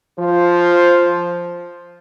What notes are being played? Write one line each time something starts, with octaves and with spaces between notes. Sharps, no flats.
F3 F4 C5